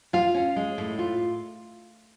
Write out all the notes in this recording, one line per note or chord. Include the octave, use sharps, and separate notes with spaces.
F4 F5
C#4
G#3
A2
F4